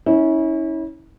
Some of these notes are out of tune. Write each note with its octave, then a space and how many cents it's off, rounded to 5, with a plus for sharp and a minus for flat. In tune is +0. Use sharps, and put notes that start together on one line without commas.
C#4 +0 E4 -35